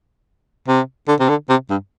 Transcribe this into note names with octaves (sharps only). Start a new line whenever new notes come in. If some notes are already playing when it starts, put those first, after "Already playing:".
C3
D3
C3
D3
C3
G2